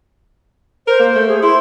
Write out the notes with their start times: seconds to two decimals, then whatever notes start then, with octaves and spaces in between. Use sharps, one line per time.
0.87 A#4 C5
0.99 A#3
1.15 A3
1.28 G#4
1.42 E4 C6